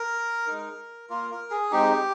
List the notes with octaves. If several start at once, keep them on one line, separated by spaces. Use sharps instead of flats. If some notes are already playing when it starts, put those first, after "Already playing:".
Already playing: A#4
G#3 D#4
A#3 F4 A#4
A#4
G#4
G#3 C4 D#4 G4